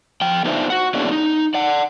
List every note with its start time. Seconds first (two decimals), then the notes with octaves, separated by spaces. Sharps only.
0.21 F3 G5
0.45 B3 D4 D#4 F4 C5 E5
0.70 F#4 F#5
0.94 A#3 B3 C#4 D4 E4 G#4
1.12 D#4
1.54 D5 F#5